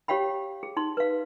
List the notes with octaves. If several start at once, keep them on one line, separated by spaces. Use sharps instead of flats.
G4 C#5 F5 G5 B5
G#4
D#4 C6
B4 F5